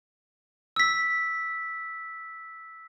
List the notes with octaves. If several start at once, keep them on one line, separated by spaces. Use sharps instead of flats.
E6 B6